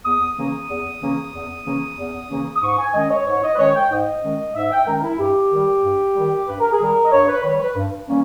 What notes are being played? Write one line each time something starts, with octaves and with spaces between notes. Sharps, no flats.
E2 D#6
C#3 E3 A#3 C#4
E2
C#3 E3 A#3 C#4
E2
C#3 E3 A#3 C#4
E2
C#3 E3 A#3 C#4
D#6
G#2 C#6
G#5
D#3 G#3 C#4 D#5
C#5
G#2 C#5
D#5
B4
D#3 G#3 C#4 C#5
G5
G#2 D#5
D#3 G#3 C#4
G#2 E5
G5
D#3 G#3 C#4 A#4
E4
G2 G4
D#3 G3
G2
D#3 G3
G2 B4
A#4
G#4
D#3 G3 A#4
D#5
G2 C#5
B4
D#3 G3 C#5
B4
G2
E3 G3 A#3 C#4